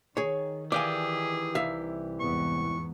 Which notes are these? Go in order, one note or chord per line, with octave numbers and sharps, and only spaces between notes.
D#3 G#4 C#5
E3 G4 G#4 D5 F5 G#5
C2 E5 F5
E2 G#2 B3 C#6